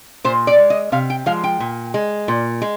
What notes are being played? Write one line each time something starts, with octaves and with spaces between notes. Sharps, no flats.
A#2 C5
D5
G#3
D#5
C3 F5
G5
F3 G#3 F5
G5
A#2
G#3
A#2
G#3